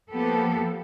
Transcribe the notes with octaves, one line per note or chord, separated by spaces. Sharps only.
F3 A#3 B3 G4 A4